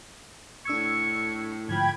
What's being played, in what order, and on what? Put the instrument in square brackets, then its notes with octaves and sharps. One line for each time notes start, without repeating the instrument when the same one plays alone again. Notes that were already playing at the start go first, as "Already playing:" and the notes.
[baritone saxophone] A2 [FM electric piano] D4 E6 G#6 [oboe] C#6
[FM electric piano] G#2 D3 F3 [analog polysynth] G5 B5 G#6